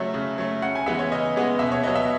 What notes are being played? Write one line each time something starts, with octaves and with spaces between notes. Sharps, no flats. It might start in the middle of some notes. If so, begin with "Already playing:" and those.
Already playing: C#3 F#3 A3 E5
C#3
F#3 A3
C#3 F#5
G#5
E3 G#3 B3 E5
C#5
C#3 D#5
E3 G#3 B3
B2 E5
C#5
F#3 B3 D#5
E5